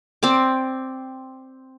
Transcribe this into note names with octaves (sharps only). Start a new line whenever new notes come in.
C4 D5 D6